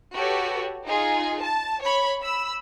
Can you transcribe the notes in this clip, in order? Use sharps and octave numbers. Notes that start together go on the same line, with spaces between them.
F#4 G4 A4 B4 C#5
D#4 F4 G#4
A5
C#5 B5
B5 E6